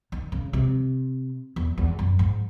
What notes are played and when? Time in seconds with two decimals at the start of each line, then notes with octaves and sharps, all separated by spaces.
0.12 D#3
0.32 C#3
0.53 C3
1.56 E2
1.78 E2
1.99 F#2
2.19 G#2